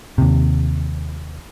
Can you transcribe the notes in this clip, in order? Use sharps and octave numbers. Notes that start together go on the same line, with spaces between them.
D#2 C3